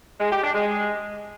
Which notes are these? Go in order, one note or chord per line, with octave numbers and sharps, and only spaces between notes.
G#3
G4
D4
G#3